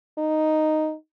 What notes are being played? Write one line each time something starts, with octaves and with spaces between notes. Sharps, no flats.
D#4